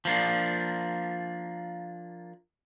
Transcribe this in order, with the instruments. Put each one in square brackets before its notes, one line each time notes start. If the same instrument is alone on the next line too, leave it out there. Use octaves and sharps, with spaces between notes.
[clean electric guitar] F3 A#3 D4